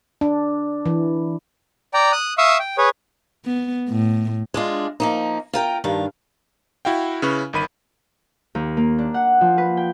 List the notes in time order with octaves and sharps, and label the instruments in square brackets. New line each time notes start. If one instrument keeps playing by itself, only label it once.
[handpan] D4
E3
[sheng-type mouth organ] D5 G5 A#5
D#6 F#6
E5 F5 C#6 D#6 E6
G5
G#4 B4 C#5
[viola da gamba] B3
A2
[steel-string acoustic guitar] G#3 D4 F4
F3 A#3 D#4
F4 A#4 G5
G2 D#3 D4 F5
[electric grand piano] E4 F#4 F5 G5
C#3 C#4 E4 B4 C#6
G1 D#3 B5 D#7
[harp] D#2
A#3
D4
F#5
F3
B4
G5